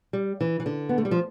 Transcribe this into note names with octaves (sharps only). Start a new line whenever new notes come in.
G3
E3
E3
D3
B3
A3
G3
F3